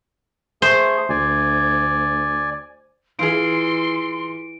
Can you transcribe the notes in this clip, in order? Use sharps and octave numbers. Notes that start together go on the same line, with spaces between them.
A3 G#4 C5
D2 D5 G#5
E3 F4 G#4 C6 D7